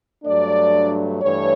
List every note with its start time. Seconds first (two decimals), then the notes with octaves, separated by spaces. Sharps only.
0.23 G2 F#3 A3 D4 D5
1.22 G2 E3 A3 C#5